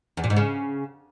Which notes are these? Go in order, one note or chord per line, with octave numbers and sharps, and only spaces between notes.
E2
A#2
G#2
C#3